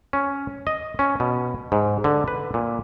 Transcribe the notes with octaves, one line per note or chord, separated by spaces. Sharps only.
C#4
D#5
C#4
B2
G#2
D3
B4
A#2